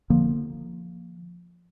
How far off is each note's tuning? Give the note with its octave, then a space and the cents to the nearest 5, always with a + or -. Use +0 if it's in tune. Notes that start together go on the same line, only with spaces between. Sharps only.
D3 +25 F3 +0 A#3 +0